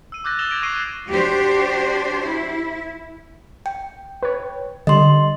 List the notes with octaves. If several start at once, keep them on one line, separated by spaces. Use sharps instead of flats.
E6 D#7
D6 E6 F#6 G6 A6 A#6
D#6 E6 A6 E7 F7 G7
G6 G#6 A#6 D7 F7
C#6 D#6 C7 D7 D#7 G7
D4 F#4 G4 C5
E4
G5
B4 C#5
D3 G3 D#5 C6